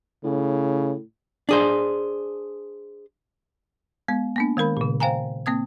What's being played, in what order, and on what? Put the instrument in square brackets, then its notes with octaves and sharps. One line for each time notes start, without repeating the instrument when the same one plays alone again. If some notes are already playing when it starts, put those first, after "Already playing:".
[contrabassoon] A2 [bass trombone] C#3
[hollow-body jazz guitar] D4 G#4 C5
[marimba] G#3 B3
A#3 B3 D4
D#3 G#3 A#4 B5
A#2 C#3
C5 F5 G5 G#5 A#5
A#3 C4 D#6 G#6